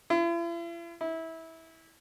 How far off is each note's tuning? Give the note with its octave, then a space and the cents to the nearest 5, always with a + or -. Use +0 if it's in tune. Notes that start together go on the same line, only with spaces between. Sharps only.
E4 +45
E4 -20